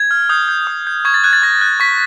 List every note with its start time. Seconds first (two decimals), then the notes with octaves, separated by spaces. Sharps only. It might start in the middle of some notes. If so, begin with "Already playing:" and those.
Already playing: G#6
0.11 F6
0.29 D#6 G6
0.49 G6
0.67 D#6
0.87 G6
1.05 C#6 G#6
1.14 A6
1.24 F#6 G#6
1.33 A6
1.42 C#6 A#6
1.61 F#6
1.80 C#6 B6